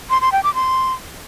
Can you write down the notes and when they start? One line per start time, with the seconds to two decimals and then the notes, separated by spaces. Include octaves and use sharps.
0.10 C6
0.21 C6
0.32 G5
0.43 D6
0.55 C6